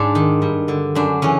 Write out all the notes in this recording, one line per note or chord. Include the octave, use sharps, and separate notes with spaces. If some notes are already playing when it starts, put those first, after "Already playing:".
Already playing: G#2 D4
D#3
G2
D3
F#2 D4
C#3 E3 C#4